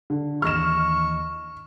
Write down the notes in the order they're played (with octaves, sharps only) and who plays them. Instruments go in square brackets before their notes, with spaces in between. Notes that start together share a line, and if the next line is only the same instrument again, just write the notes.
[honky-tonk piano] D3
[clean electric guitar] D#2 E3 D#5 [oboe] C#6 [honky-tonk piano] F6 E7